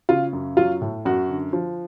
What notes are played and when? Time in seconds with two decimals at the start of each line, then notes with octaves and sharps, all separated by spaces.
0.09 C#3 F4
0.33 F#2
0.57 F#3 F4
0.81 A2
1.05 F#2 F#4
1.29 D3
1.53 F3